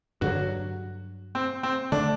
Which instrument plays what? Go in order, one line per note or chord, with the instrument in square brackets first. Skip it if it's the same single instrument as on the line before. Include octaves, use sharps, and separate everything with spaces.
[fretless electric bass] G2 D3 F#3 [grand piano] F#4
[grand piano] C4
C4
[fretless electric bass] D3 A3 [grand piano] D4